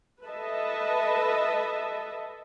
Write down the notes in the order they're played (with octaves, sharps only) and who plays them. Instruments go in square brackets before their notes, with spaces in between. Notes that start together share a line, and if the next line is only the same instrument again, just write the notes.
[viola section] A4 B4 D#5 E5 A5